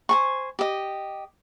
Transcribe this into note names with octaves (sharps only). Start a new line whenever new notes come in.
C5 G#5 C#6
G4 D#5